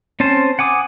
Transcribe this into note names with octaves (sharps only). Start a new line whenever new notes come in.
C4 C#4 C5 A5
F#5 G#5 D6 D#6